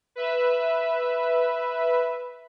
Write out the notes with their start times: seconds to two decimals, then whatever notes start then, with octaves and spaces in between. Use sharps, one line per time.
0.16 B4 E5